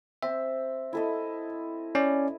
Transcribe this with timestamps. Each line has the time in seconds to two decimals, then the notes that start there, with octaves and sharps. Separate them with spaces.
0.23 C4 E5
0.93 E4 A4 D#5
1.95 C#4 D5